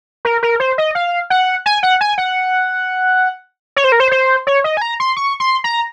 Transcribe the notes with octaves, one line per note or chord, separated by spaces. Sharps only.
A#4
A#4
C5
D#5
F5
F#5
G#5
F#5
G#5
F#5
C#5
C5
A#4
C5
C5
C#5
D#5
G#5
A#5
C6
C#6
C6
A#5